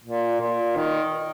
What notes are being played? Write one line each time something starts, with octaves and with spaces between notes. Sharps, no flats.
A#2
A#2
D#3